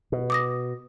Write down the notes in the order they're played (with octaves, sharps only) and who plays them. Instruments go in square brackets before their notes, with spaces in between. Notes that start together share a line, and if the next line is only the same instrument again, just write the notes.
[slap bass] B2
[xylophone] D6 D#6 A#6